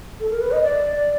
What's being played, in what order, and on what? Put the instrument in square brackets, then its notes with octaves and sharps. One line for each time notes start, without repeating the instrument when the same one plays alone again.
[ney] A4
A#4
B4
D#5
D5